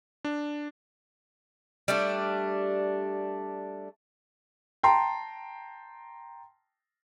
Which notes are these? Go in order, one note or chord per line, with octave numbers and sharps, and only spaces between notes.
D4
G3 A3 D4
G5 A5 A#5 C6